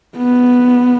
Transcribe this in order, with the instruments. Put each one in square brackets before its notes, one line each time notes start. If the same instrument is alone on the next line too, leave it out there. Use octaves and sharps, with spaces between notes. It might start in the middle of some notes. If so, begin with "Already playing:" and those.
[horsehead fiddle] B3